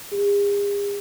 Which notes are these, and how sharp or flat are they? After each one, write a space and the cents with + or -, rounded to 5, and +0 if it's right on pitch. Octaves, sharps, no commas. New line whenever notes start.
G#4 -45